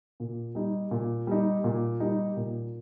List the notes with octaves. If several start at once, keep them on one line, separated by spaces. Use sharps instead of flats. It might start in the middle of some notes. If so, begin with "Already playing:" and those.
A#2
G3 D#4
A#2
G3 D#4
A#2
G3 D#4
A#2